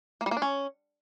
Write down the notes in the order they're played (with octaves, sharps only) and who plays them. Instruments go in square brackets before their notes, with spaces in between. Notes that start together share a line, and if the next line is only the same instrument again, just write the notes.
[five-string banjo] A#3
G3
A#3
D4
C#4